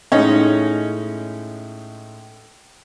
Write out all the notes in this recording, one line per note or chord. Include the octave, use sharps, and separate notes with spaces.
A2 G#3 C#4 D#4